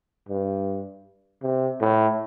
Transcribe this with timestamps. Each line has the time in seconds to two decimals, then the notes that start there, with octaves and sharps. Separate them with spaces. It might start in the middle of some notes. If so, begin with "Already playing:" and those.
0.29 G2
1.43 C3
1.81 A2